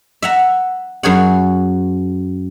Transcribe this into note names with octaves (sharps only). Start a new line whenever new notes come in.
E5 F#5 A#5
F#2 G#4 C#5 F#5